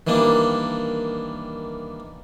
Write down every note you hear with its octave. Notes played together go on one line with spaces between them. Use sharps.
D#3 E3 G3 A#3 D4